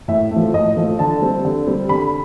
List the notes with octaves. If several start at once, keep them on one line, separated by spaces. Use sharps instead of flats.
A2 E5
A3
F3
A2 D#5
F3 A3
D3 A5
G3 C4
D3
G3 C4
D3 B5